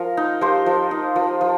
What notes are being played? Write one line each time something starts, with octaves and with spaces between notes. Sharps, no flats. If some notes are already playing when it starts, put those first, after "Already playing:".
Already playing: F3 F4 A#4
D#4
F3 G4 C5
F3
D#4
F3
F3